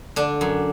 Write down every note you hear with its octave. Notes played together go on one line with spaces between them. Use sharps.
D3 D4
F#2